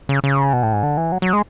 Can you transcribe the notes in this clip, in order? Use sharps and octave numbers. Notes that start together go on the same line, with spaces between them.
C#3
C#3
B2
A2
G#2
D3
E3
F#3
F#3
G#3